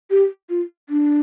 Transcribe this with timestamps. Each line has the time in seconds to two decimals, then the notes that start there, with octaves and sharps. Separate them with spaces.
0.11 G4
0.50 F4
0.89 D4